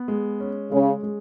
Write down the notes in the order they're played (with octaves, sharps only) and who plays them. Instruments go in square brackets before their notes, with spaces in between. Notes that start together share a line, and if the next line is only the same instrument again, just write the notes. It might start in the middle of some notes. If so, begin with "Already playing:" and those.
Already playing: [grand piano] B3
G#3
C#4
[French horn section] C#3 [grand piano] G#3
[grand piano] G#3